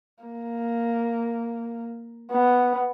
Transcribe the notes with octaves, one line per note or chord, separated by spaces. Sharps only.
A#3
B3